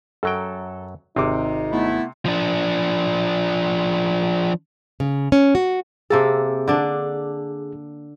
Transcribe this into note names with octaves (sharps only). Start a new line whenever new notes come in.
F#2 F#3 A4 G5
G#1 C3 D#4 D6
A3 B3 E4
F3 D4
C#3
C#4
F#4
C3 A#3 G#4 A4
D3 D4